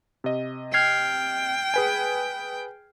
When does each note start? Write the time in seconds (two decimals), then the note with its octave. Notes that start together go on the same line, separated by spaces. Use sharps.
0.24 C3 D#5
0.74 G5 F6 G#6 C7
1.74 G#4 B4 G#5